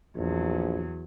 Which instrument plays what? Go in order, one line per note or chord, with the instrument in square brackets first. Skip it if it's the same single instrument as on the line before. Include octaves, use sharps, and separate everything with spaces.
[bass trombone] A#1 [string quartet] E2 F#3